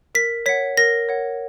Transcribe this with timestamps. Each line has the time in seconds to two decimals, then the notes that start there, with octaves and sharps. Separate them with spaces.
0.15 A#4 B6
0.46 C#5 F#5 B6
0.77 A#4 A#6
1.09 C#5 F#5